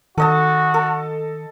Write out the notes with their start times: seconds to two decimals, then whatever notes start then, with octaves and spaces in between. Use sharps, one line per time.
0.18 D#3 F#4 A4 D#5 A5
0.74 A4